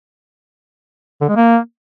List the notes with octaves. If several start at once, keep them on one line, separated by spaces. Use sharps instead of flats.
D3
G#3
A#3